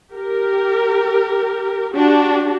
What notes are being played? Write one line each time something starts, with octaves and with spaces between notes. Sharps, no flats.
G4 A#4
D4 F#4 G4